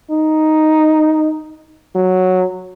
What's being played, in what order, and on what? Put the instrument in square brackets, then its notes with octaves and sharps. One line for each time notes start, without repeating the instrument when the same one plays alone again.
[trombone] D#4
F#3